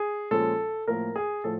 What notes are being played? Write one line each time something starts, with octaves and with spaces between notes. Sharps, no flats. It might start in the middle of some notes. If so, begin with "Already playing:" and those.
Already playing: G#4
A#2 F3 G#3 C#4 A4
A2 F3 A#3 A#4
G#4
A2 F3 A4